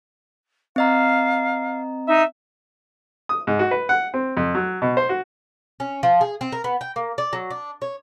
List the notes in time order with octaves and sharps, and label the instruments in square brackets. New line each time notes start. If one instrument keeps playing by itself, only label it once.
[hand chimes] C4 D#5 A#5 [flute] F5
[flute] D#4 [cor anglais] E5
[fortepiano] D#6
G#2
F#4
B4
F#5
C4
F2
F#3
B2
C5
F#4
[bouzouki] C#4
F3
G#4
C4
A#4
B3
G5
A#3
D5
F#3
D4
C#5